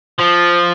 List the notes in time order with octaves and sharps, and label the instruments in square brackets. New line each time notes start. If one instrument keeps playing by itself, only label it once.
[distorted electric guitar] F3